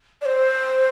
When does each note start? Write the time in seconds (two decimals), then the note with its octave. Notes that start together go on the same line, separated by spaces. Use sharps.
0.22 D5
0.26 C5